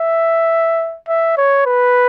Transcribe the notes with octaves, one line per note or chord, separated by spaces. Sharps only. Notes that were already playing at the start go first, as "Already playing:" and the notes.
Already playing: E5
E5
C#5
B4